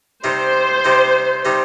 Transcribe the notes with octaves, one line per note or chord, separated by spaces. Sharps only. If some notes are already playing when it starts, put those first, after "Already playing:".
C3 G3 C4 D#4 C5
C3 G3 C4 D#4
C3 G3 C4 D#4